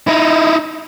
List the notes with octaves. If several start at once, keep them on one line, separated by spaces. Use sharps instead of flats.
D#4 E4